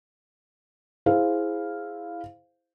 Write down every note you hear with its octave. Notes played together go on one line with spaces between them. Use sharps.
E4 G#4 C5 F5